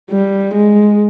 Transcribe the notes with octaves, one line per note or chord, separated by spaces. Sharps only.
G3
G#3